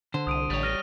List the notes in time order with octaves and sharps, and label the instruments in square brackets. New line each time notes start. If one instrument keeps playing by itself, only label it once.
[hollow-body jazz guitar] D3 [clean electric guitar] C5
[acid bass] C2 [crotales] D#6 D7 D#7
[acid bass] A1 [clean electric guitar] G3 C#5
[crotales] F6 A#6 D#7